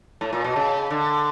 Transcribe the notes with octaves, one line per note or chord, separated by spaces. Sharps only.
A2
A#2
B2
C#3
D3